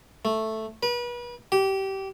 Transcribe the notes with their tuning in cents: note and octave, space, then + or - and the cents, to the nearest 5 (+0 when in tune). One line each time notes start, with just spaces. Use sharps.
A3 +0
B4 -35
G4 -20